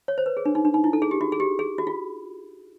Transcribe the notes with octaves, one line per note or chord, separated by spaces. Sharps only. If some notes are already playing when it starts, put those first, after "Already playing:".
C#5
C5
B4
G#4
D4
D#4
D4
D#4
E4
A4
G#4
G4
F#4
G#4
G4
G#4
F#4
F4